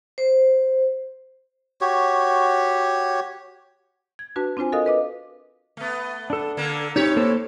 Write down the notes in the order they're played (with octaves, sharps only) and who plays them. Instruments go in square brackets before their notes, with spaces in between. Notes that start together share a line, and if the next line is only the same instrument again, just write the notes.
[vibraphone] C5
[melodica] F#4 G4 C#5
[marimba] G#6
D4 F#4 B4 A5
C4 D4 F4 C5 G#5
F#4 A4 A#4 D#5 F5 D#6
B4 D#5 D6
[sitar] A3 B3
[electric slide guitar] D4 A4
[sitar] D3 A#3
[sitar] A2 C4 C#5 [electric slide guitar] D#4 G4
[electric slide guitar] A#3 A4 C5